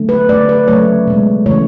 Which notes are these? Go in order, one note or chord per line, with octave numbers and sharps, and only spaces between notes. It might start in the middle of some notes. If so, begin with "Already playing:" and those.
Already playing: D3 F#3 A3
B4
D3 A3 D5
B4
C#3 F#3 A3 C#5
B2 G#3
C#3 E3 A3 C#5